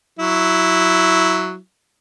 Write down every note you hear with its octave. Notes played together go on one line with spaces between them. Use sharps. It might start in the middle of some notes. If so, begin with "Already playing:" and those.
F#3 E4